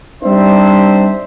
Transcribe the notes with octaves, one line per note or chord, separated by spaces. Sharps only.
G3 C4 D4 D#4 C5 E5